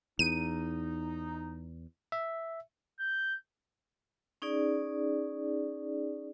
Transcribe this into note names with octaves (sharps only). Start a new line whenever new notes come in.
E2 D#4 D#7
E5
G6
C#4 D#4 G#4 D5